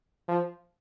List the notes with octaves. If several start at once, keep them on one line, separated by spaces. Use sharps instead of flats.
F3